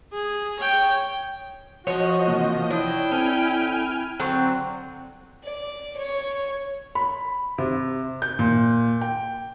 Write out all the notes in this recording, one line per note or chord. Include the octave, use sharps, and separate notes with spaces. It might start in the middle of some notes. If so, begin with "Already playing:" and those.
G#4
C#5 G5
F3 F#4 C#5 D#5
C3 E3 A#3
D4 E4 C#5 G5 D#6
C4 A4 G#5 F6 D#7
D3 F#3 C4 G5 C#6 G6
D5
C#5
B5
C3
G6
A#2
G5